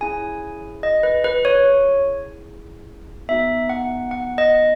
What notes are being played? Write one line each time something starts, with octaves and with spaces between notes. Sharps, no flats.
C#4 E4 G#4 G#5
D#5
B4
B4
C#5
B3 D#4 F#4 E5
F#5
F#5
D#5